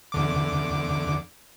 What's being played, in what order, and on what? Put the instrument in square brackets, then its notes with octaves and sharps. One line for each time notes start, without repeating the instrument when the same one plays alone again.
[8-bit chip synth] E2 D3 D6